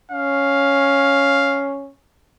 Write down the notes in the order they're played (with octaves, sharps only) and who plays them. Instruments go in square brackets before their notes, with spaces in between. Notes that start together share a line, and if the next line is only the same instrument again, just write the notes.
[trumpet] C#4 [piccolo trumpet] F5